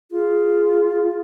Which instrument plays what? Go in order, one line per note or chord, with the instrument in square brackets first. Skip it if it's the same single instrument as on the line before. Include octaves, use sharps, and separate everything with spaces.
[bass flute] F4 [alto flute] G#4